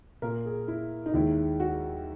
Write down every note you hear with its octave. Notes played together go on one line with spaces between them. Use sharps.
A#2 A#3 A#4
G#4
E4
D#4
D#2 D#3 G#3 E4
F#4